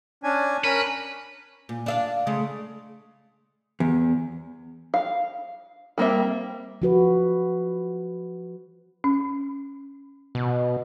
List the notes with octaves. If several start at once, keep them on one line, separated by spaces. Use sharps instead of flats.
C#4 D4 G#5
C#4 A#4 B4
A#2
D4 E5 F5
C#3 G#3 A3
E2
F5
G3 A#3 C4 E5
F3 F#4 B4
C#4
B2